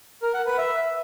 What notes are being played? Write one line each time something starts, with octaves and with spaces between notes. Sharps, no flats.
A#4
F#5
B4
E5